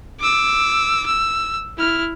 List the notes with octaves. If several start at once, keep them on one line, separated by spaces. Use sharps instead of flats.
D6 E6
E6
E4 F6